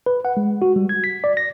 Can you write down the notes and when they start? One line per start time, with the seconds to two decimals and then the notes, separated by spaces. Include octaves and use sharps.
0.06 B4
0.25 F#5
0.37 G#3
0.62 F#4
0.76 G3
0.89 G#6
1.04 B6
1.24 D5
1.37 A#6